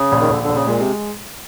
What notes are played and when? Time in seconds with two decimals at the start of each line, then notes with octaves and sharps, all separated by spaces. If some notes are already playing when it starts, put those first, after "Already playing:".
Already playing: C#3
0.12 A#1
0.20 D#3
0.30 A#1 D3
0.43 D3
0.49 A#1
0.55 C#3
0.67 A#2 G#3
0.79 C3